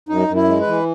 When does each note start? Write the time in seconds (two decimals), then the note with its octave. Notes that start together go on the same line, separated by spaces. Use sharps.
0.09 F#2 D#4
0.28 F#2
0.35 E4
0.48 G#3
0.61 B4
0.67 E3